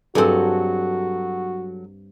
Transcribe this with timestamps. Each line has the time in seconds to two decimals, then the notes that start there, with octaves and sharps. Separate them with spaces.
0.15 G2 F#3 C4 F#4 G#4 A4